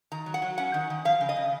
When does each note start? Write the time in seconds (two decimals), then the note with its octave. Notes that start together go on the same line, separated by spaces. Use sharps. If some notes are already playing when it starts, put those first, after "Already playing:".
0.12 D#3 A#5
0.26 F#3
0.34 F#5
0.42 F#3
0.58 C#4 F#5
0.74 D#3
0.90 D#3
1.05 F3 F5
1.21 C#3
1.29 D#5
1.36 C#3